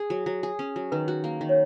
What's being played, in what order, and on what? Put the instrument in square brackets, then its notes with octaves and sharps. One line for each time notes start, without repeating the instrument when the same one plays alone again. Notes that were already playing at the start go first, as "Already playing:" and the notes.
Already playing: [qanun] G#4
F#3
F#3
G#4
C#4
F#3
[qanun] D#3 [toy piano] B4
[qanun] F#4
A#3
D#3
[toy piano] C#5